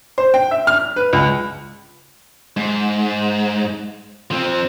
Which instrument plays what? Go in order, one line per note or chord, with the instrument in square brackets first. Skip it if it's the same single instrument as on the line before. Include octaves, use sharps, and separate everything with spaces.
[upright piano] C5
G5
E5
F6
B4
C#2
[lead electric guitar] G#2
F3 C4